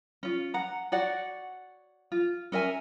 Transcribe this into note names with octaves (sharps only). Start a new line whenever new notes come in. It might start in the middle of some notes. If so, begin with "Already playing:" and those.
C#4 F4
F#5 A#5
F#4 C#5 D5 F#5
F4
C#4 A#4 E5 G#5